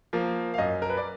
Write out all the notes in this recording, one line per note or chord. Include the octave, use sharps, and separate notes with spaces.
F3 A#3
F5
F#2 D#5
A#4
B4
D5